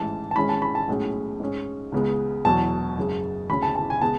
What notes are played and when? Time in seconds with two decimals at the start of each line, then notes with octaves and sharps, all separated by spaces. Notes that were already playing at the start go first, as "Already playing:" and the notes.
Already playing: A1 G#2 E3 A5
0.31 A5
0.36 G#1 G#2 G#3 C#4 B5
0.49 A5
0.62 B5
0.75 A5
0.88 B1 A2 G#3 C#4
1.40 G#2 G#3 C#4
1.92 C#2 C#3 G#3 B3
2.45 E1 E2 B2 F#3 A5
2.97 F#1 F#2 C#3 G#3
3.49 D2 C#3 G#3 C#4 B5
3.62 A5
3.75 A5
3.90 G#5
4.01 C#3 G#3 B3 A5